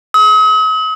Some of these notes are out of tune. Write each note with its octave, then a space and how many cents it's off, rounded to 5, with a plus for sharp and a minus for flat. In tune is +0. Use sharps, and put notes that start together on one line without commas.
D#6 +45